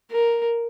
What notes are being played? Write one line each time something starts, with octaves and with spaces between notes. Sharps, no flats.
A#4